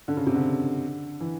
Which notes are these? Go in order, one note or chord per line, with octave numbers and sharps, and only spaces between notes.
D3
C#3
C3
D3
E3